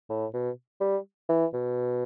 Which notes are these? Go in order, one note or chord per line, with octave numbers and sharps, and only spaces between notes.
A2
B2
G3
E3
B2